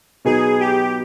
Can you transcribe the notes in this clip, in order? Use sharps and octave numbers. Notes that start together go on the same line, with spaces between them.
B2 F#3 B3 D#4 G#4
G4